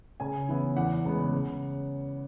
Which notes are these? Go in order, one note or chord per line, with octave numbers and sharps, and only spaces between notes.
C#3 G#5
E3 B3 E4
E2 F#5
C#3 G#3 B3
C#3